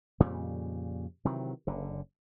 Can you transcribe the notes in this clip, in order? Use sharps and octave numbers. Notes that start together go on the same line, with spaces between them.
F2 A#2 C#3 G3
C3 D#3 E3 F#3
F#1 D3